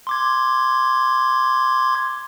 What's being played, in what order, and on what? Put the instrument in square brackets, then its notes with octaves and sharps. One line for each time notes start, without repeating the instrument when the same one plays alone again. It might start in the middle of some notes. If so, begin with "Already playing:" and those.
[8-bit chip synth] C6 D6 G#6